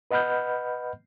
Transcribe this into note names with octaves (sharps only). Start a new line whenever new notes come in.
B4 D#5 F#5 B5 F6 G6